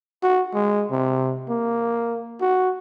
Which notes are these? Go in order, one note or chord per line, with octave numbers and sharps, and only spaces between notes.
F#4
G#3
C3
A#3
F#4